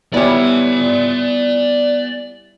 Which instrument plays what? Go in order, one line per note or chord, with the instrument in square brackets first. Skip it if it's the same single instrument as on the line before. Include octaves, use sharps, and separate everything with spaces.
[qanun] G3 E4 [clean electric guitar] B3 C#5 [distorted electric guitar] D5 G#5